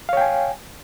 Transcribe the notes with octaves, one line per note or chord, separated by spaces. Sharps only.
C#5 F5 G5 G#5